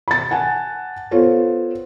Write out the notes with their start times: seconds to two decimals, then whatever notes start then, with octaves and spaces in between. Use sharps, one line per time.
0.08 B5 A6
0.31 F#5 G#5 A5
1.11 B3 F4 A4 C5 C#5